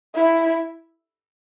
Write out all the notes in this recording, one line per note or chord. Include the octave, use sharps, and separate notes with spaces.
E4